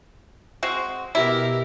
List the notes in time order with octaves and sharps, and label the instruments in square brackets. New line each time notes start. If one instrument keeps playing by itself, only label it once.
[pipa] G#3 C4 F#4
[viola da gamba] B2 G4 A#4 [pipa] E4